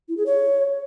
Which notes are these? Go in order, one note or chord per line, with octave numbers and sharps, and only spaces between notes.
E4
G#4
C#5